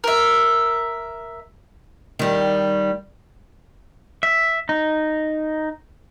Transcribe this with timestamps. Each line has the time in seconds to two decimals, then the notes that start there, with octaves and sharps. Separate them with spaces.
0.04 A#4 E5
2.19 D#3 G3
4.23 E5
4.69 D#4